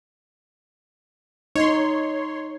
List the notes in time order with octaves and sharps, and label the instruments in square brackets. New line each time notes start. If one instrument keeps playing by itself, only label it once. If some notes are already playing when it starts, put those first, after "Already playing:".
[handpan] D#4 [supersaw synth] C#5 C6